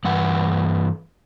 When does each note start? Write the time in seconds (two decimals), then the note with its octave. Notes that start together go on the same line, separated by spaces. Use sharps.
0.05 G2 E3 F#5